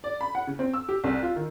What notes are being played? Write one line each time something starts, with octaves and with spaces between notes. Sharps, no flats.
D5
B5
F#5
C#3
C4
E6
G4
C2
F4
D#3